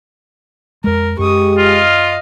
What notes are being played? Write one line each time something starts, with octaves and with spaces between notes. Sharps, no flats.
F2 G#3 A#4
F#2 G#3 G4 C#6 D#6
F4 D#5 F5